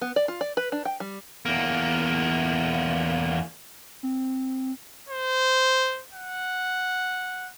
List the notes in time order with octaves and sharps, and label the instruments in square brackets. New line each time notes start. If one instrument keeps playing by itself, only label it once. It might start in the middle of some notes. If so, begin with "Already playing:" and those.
[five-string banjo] B3
D5
F4
D5
B4
D4
G5
G3
[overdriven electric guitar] E2 A#3
[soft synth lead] C4
[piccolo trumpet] C5
F#5